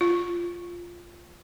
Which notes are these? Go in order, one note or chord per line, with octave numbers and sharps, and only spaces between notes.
F4